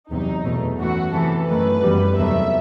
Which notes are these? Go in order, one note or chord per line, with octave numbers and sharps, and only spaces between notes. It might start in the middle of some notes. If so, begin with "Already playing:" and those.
E2 C3 F#3 D#4
E2 B2 A3
F#2 E3 A3 F#4
C3 E3 B3 A4
F#2 D#3 A3 B4
F#2 E3 G3 B3
E2 C3 D#3 F#3 A3 E5